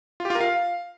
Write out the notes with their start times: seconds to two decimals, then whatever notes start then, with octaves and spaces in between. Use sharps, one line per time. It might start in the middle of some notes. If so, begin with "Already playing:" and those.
0.20 F4
0.25 G4
0.30 F4
0.35 A#4
0.41 F5